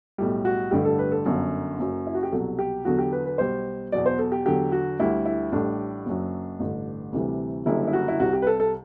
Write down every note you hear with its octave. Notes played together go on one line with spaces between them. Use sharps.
B1 A2 G3
F#4
A1 G2 D3 G3 G4
A4
B4
A4
G1 F#2 D3 F#3
F#1 F#2 F#3
E4
F#4
G4
C2 B2 F#3 A4
G4
E2 D3 F#3 F#4
G4
B4
B4
B1 B2 G3 C5
E2 B2 F#3 D5
C5
A4
G4
E2 D3 F#3 G4
F#4
D2 D3 G3 E4
E4
A1 A2 G3 D4
F#1 F#2 F#3
A1 G2 D3
D2 C3 E3 G3
F#1 F#2 D3 G3 E4
E4
F#4
E4
C2 C3 G3 F#4
G4
B4
A4
A4